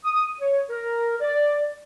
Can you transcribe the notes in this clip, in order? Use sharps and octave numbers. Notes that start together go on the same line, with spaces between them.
D#6
C#5
A#4
D5